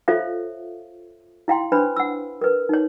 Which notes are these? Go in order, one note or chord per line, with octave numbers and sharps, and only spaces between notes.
F4 A4 C5 C#5 E5 F5
E4 F5 G5 C6
D4 B4 C5 B5
F#5 E6
A#4 B4
D#4 C#5